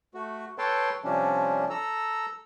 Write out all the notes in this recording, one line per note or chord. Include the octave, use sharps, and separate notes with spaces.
A3 F#4
A4 B4 C#5 G5 A5 C6
C3 F3 G3 C#4 D4
A4 A#5 E6